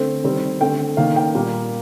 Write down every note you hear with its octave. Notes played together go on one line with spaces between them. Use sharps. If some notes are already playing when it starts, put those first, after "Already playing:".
Already playing: D3 A3 C4 C5
D#3 G3 C4
D3 A3 C4 G5
D#3 A#3 F5
G5
A#2 G3 A#3